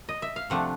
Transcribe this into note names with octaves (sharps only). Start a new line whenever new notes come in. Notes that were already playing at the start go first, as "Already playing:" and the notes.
D#5
E5
F5
C3 F3 A3 D4 F#5